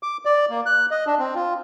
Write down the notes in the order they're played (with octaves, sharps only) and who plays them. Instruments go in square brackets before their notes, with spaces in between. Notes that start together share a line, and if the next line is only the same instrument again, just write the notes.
[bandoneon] D6
D5
A#3
F#6
D#5
D4
C4
F4